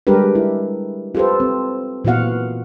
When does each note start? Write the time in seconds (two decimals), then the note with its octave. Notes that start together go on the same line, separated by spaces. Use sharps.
0.07 G3 G#3 D4 G4 A#4 B4
0.35 E4
1.15 F4 G4 A4 B4 C5
1.40 C4
2.05 A#2 E3 B3 F#4 F5 F#5